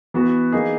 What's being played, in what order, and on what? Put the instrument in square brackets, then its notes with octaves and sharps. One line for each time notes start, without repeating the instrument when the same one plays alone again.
[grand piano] E3 B3 F#4
E3 A#3 D#4 G#4